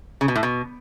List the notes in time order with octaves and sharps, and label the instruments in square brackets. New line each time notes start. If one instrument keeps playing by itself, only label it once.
[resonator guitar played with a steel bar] C#3
B2
A2
B2